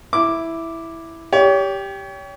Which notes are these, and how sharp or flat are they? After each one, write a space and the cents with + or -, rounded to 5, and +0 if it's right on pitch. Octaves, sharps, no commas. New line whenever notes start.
E4 +0 D6 +0
G4 +0 C#5 +35